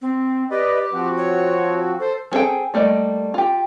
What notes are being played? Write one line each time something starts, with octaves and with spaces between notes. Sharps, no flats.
C4
G4 B4 D5 D#5
F3 C4 F#4
C#5
A4 C5
F3 C4 G#4 A4 G5
G3 A3 A#3 D5 D#5
F4 G4